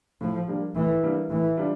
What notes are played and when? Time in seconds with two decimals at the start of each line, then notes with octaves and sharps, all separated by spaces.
0.21 A2 F3
0.48 G3 A#3 D4
0.75 A2 E3
1.03 G3 A#3 D4
1.30 A2 E3
1.57 G3 D4 F4